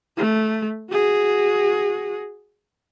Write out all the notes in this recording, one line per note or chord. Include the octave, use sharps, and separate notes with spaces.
A3
F#4 G#4